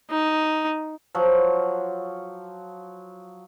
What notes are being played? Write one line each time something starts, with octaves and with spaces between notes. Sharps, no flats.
D#4
F3 F#3